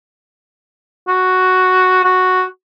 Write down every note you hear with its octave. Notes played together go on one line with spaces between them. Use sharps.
F#4
F#4